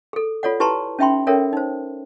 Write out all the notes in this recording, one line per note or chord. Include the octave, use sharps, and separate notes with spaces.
G#4 A4
F4 A4 C#5 D5 F#5
E4 G4 B4 A5 A#5 C6
C#4 D#4 E5 G5 B5 C6
C#4 A4 A#4 C#5 E5 G5
D#4 C5